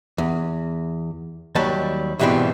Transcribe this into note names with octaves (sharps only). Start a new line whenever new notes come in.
E2
D#2 F#3 G3 A5
E2 G#2 B2 E3 G3 C4